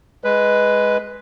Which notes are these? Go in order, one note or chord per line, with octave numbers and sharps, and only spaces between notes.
G#3 B4